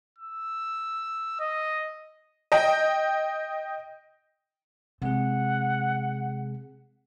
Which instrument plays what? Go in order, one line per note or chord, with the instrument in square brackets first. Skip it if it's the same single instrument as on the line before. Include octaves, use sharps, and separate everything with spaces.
[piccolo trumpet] E6
D#5
[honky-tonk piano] D#5 G5
[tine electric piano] C3 G#3 G#4 [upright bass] C4 [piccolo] F#5